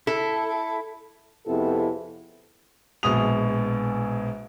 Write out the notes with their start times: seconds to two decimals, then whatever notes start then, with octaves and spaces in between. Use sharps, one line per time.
0.07 E4 A4
1.46 F2 C3 B3 E4 G#4 A4
3.03 A#1 B2 G#3 D#6 F7